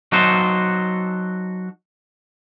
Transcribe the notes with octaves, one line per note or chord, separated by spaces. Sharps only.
F#3 D#4 F#4 A4 C5